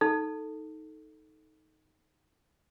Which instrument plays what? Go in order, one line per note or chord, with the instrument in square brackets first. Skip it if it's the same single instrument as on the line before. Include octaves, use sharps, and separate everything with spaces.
[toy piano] D#4 A4